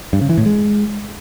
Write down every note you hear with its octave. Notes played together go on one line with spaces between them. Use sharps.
G2
C#3
E3
A2
G#3